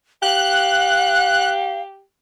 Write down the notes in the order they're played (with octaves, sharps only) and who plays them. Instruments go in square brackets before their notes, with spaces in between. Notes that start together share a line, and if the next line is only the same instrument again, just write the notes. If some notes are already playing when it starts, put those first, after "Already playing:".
[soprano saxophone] G4 [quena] F5 [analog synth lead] F#6